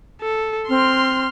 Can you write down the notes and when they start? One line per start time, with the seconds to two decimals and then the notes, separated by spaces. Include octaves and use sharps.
0.21 A4
0.69 C4 C6 F6